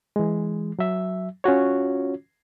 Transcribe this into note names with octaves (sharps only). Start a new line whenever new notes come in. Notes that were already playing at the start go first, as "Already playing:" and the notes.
E3 G#3
F#3 E5
C#4 F4 F#4 C#5